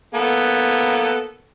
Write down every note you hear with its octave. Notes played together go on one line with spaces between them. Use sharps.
A#3 B3 A4